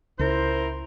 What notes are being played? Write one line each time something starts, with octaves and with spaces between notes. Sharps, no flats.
C#2 E4 A#4 C5